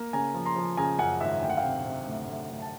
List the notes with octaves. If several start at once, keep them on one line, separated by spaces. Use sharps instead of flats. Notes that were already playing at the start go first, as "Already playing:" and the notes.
Already playing: A#3
C#3 G#5 A#5
F3
A#5 C6
F3
C#3 G#5 A#5
F#2 F#5 G#5
G#1 E5 F#5
D2 G5
F#5
F5 G5
C3
C3
D2
D2
D2
A5